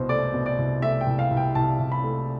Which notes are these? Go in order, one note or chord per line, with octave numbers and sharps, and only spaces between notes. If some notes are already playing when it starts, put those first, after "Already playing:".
Already playing: C2 B2 C5
A3 D5
B2
D5
C2
A3 E5
G5
C2
F5
C2
G5
C2 A5
C2
B5
A3